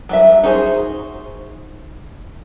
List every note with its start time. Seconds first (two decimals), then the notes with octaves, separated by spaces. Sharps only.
0.09 F#3 G3 E5
0.43 D#4 F#4 G#4 C5